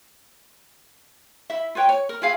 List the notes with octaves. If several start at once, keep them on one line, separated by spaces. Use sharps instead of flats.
E4 E5
F4 B4 C#5 G5
C#5
A#4
E4 F4 G#4 F5